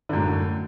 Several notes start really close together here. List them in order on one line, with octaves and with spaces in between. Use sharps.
D3 F#2 A2